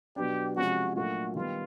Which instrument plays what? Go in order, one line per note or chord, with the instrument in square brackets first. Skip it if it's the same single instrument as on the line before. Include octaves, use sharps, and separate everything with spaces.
[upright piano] B2 F#3 B3 D4 [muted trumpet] G4
[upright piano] C3 F3 G#3 C#4 [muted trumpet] F#4
[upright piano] A#2 F#3 A3 D4 F4 [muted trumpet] F#4
[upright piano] D#3 G3 B3 [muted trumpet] F4